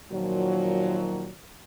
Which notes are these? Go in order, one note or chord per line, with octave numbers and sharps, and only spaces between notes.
A#2 D#3 F3 F#3